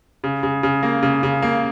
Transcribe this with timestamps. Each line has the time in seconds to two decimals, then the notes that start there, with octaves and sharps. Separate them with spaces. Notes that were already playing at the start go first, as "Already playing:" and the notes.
0.24 C#3
0.43 C#3
0.63 C#3
0.83 A#3
1.03 C#3
1.23 C#3
1.42 A#3